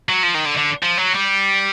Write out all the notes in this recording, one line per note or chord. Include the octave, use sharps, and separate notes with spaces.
F#3
F3
D#3
D3
D3
F3
F#3
G3